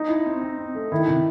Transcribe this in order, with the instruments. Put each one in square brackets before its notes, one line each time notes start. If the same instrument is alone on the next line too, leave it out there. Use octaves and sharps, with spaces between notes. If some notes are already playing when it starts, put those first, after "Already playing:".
Already playing: [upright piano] D#4
[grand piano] E4
C4
C4
C4
A3
[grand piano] D#3 [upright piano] E4
[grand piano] C3